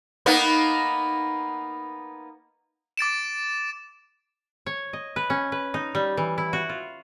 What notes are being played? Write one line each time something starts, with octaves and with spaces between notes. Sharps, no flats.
A#3 B3 D#4
D6 A6 D7 E7
C#5
D#5
B4
C#4
B4
D#4
G3
E3
E4
F#4
F4